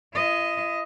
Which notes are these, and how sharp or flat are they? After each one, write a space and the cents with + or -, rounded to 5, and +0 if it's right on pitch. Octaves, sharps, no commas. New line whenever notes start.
E4 +45 D#5 +0